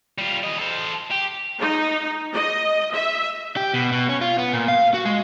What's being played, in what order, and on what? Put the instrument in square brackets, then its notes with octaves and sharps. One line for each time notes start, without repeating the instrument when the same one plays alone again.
[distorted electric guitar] G3 F4
E3 D#5
A4 C5
G4
[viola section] D#4
D#5
E5
[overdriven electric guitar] G4
B2
B2
C#4
F4
B3
A#2
F5
F#4
G#3